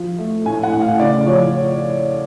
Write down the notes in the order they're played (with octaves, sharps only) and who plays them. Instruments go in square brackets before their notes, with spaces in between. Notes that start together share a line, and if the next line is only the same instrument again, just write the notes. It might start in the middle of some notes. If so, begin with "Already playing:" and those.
Already playing: [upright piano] F3
A3
A2 G#5
F#5
A2
F5
C#3 D5
F3 C#5